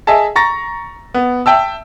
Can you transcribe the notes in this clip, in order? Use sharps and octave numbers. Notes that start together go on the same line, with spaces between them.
G#4 D#5 E5 G#5 A5
A#5 C#6 A6 A#6
B3
E5 G5 A5 E6